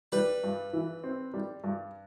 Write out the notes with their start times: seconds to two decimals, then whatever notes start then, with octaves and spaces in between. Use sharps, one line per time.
0.12 G3 B4
0.44 G2
0.73 E3
1.04 C4
1.34 G3
1.64 G2